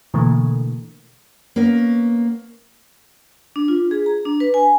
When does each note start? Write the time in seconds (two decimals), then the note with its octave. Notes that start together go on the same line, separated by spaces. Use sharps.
0.14 B2 D3 E3 A3 A#3
1.56 A#3 B3 C#4 A#4
3.56 D4
3.68 F4
3.91 G#4
4.06 A#5
4.25 D4
4.40 B4
4.54 G#5